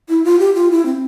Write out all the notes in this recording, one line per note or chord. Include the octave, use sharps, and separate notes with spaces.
E4
F4
G4
F4
E4
C4